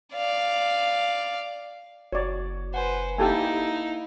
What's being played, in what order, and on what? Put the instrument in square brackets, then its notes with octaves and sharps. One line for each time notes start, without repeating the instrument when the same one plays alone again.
[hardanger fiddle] D5 F5
[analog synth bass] F#1 [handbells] F#4 [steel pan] C#5 D5
[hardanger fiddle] B4 C5 [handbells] F#5 G#5
[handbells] A#3 [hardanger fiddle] D#4 E4 [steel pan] G4 A4 G#5